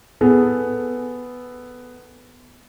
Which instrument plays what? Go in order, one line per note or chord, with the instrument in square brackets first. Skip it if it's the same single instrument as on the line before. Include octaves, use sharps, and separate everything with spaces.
[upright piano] B3 G#4 A4